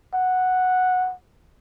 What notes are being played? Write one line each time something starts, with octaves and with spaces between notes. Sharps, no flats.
F#5